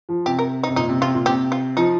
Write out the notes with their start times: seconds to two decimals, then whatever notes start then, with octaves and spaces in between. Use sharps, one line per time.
0.09 F3
0.26 C3 G4
0.39 A#4
0.63 D#4
0.69 C3
0.76 A#2 D#4
0.89 C3
1.01 C3 F4
1.14 A#2
1.26 C3 G4
1.52 F4
1.77 F3 D#4